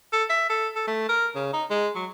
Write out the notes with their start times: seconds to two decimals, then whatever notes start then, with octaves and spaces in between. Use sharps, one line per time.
0.13 A4
0.29 E5
0.50 A4
0.76 A4
0.87 A3
1.09 A#4
1.35 C#3
1.53 D#4
1.70 G#3
1.95 F#3